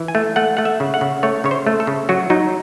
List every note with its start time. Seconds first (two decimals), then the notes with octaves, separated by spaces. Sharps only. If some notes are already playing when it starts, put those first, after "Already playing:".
Already playing: E3
0.08 G#5
0.15 A3
0.36 A3 F#5
0.57 A3 F#5
0.65 E5
0.80 C#3
0.94 F#5
1.01 C#3
1.23 A3 C#5
1.44 C#3 C#5
1.51 C5
1.66 A3
1.80 A4
1.87 C#3
2.09 F#3 F#4
2.30 F#3 D#4